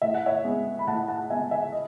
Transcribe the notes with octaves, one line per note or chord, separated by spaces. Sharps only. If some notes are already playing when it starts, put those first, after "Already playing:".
A2 E5
F#5
C#5 E5
G#3 B3
B5
A2 F#5 A5
F#5 A5
G#3 B3 E5 G#5
E5 G#5
D#5